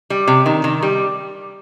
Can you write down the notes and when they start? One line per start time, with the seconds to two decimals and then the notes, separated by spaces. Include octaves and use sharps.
0.10 G3
0.28 C3
0.46 D#3
0.64 D#3
0.83 G3